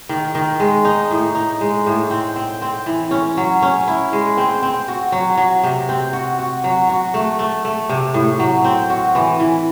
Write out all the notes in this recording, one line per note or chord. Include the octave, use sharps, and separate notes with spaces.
D#3
D#3
G#3
D#4
A2
D#4
G#3
A2
C4
C4
C4
E3
C#4
F#3
C#4
E4
G#3
C4
C4
F#4
F#3
F#3
C3
C4
F#4
F#4
F#3
F#4
A3
A3
A3
C3
A2
F#3
C4
F#4
E3
E3